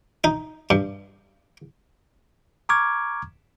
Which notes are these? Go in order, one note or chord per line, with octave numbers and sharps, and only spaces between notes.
D#4
G2
A#5 C#6 D6 F6 G#6